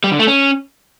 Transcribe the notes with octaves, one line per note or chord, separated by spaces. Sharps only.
G3
D3
A3
C#4